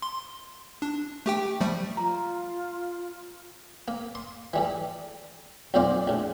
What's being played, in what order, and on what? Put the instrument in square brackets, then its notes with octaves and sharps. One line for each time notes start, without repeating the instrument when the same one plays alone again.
[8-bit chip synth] C6
D4
A3 G4 G5
F3 G3 A3
[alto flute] F4 [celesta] A#5
[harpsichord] A#3
C6
E3 G3 A4
B1 F2 A#2 C5 D5 F5
A#1 A2